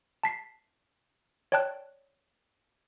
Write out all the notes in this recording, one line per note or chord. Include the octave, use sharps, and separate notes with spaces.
A5 B6 C7
C#5 D5 G5 A5 F#6